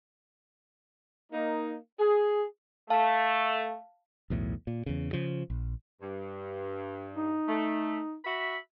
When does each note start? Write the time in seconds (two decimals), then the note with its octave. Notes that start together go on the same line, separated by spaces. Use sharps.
1.33 A#3 D#4
1.99 G#4
2.90 A3 F5 A5
4.30 B1 E2 A2
4.67 A#2
4.86 E2 C#3
5.13 C#3 F3
5.50 A#1
6.01 G2
7.15 D#4
7.48 A3
8.25 F#4 E5 B5